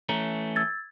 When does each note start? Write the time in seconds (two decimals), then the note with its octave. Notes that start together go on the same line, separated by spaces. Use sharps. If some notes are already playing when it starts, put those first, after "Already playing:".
0.09 E3 A3 C#4 A#5
0.56 E6 G#6 A6